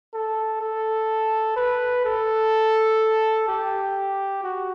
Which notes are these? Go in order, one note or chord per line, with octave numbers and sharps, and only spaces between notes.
A4
A4
B4
A4
G4
F#4